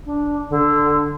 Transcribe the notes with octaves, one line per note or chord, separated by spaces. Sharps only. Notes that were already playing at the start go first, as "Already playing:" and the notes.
D4
D3